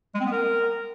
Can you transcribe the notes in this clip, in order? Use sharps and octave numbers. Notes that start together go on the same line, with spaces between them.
G#3
C4
B3
A#4